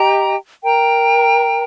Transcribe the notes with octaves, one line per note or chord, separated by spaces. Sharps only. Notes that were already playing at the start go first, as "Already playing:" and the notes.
Already playing: G4 D#5 G5 A#5
A#4 G5 A#5